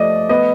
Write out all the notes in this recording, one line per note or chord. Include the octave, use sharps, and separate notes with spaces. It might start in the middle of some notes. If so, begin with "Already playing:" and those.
Already playing: F3 A3 D5 D#5
B3 D#5